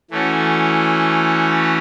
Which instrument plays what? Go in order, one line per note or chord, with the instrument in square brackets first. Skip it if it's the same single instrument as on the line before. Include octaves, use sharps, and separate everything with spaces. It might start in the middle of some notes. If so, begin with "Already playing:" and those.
[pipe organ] E3 A3 C#4 F#4